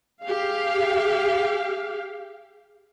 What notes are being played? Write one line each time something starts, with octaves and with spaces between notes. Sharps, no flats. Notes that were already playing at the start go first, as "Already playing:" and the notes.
G4 G#4 F5